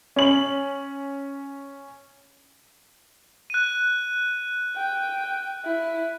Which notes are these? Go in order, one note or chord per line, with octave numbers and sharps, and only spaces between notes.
C#4 F#7
F#6 D#7
G5
E4